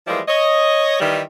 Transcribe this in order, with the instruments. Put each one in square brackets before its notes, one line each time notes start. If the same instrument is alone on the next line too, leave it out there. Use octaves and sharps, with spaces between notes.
[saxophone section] E3 F3 G3 G#3 A#3 E4
C#5 D#5
D#3 E3 G3